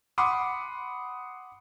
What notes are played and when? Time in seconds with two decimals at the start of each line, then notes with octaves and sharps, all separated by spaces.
0.18 F#5 B5 C6 D6 D#6